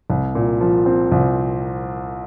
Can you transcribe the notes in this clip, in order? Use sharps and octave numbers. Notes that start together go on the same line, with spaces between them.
C2
A#2
F3
C4
C2